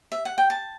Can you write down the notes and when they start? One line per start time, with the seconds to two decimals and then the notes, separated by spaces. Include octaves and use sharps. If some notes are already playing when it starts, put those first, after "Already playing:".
0.12 E5
0.25 F#5
0.38 G5
0.50 A5